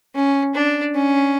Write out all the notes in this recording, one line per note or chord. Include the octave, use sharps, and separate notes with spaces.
C#4
D4
C#4